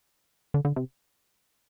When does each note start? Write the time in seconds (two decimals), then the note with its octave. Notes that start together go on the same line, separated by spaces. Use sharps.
0.54 D3
0.65 D3
0.76 C3